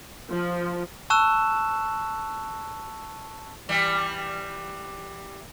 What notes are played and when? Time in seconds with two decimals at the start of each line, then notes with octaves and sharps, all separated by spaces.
0.32 F3
1.10 A5 C#6 E6 F#6 E7
3.69 E3 G3